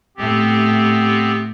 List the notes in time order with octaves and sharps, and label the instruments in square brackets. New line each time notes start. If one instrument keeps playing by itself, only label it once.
[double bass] A2 A3 [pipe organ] B3 C4 G4